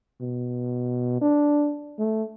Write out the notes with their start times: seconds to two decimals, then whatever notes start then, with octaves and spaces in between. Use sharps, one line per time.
0.21 B2
1.21 D4
1.99 A3